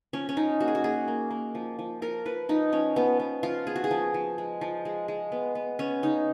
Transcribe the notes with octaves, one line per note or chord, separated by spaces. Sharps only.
F3 C#4
C#4
F3 D#4
A#3 F#4
G#4
F#4
A#3 G#4
A#3
A#3
F3
F3
F3 A#4
F3 B4
F3 D#4
F3 C#4
F3 B3
B3
F3 F4
B3 G#4
F#4
G#4
F3
F3
G#3
F3
G#3
G#3
B3
B3
B3 C#4
C#3 D#4